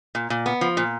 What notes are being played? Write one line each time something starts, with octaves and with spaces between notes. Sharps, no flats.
A#2
A#2
B3
F3
A#2